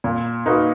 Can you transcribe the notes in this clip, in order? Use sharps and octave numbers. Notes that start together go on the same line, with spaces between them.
A#2
A#3 D#4 F#4 B4